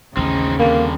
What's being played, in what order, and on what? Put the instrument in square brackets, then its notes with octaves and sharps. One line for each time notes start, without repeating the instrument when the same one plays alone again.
[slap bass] A1 D#2 [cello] C#3 [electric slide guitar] C4 D#4
[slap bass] D#2 G#3 C4 [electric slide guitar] D3 G3 [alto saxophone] A#3